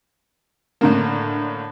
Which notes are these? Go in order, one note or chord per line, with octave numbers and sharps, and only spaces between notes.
A2 D3 A#3